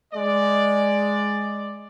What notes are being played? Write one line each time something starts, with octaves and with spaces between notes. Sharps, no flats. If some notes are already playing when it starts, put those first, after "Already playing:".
G#3 D5